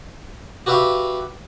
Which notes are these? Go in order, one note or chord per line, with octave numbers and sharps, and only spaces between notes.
F#4 G4 B4 E5 F5